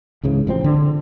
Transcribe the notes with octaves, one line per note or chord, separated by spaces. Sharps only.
C#2 G#2 C#3 E3
A1 F3 F#3 C4
D3